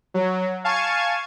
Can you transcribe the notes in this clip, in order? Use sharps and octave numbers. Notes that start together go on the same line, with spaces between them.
F#3
F5 G#5 A5 C#6 G#6